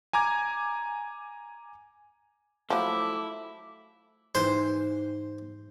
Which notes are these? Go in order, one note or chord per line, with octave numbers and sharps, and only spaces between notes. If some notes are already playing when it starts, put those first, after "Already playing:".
G#5 A#5 D6 G#6
F3 F#3 A3 E4 D6
G#2 E3 G4 C5